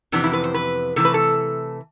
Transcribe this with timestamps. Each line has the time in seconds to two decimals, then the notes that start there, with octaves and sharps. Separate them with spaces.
0.12 F2 C3 E3 B3 D4
0.24 E4
0.33 B4
0.44 C5
0.54 B4
0.96 C3 E3 A3 A4
1.05 B4
1.14 A4